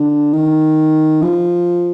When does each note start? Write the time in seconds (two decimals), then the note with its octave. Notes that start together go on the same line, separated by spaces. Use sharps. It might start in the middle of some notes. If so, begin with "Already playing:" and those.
Already playing: D3
0.33 D#3
1.22 F3